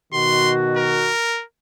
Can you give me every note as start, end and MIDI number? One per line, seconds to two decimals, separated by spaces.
0.13 1.11 47
0.13 1.11 51
0.13 1.11 66
0.13 0.53 84
0.77 1.44 70